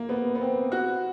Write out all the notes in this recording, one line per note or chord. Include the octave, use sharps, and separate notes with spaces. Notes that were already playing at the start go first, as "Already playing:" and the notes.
Already playing: A#3
B3
B3
C4
F#4